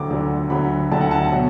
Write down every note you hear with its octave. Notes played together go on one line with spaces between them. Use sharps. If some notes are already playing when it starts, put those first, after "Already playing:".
Already playing: D2 D3 F#3 D6
D2 D3 F#3
D2 D3 F#3 B5
D2 D3 F#3 A5
F#5
A5
F#5
B2 F#3